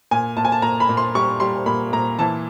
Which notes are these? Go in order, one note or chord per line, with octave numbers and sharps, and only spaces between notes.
A#2 G#5
A#2 A5
G#5
A5
A#2 A#5
B5
A#2
C6
G3 C#6
G3 C6
A#2 B5
A#2 A#5
E3 A5